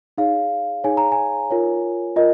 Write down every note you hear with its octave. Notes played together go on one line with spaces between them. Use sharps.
D#4 G#4 C#5 F5
D#4 G#4 C#5 G#5
A#5
G#5
F4 A#4 C#5
F4 A#4 D#5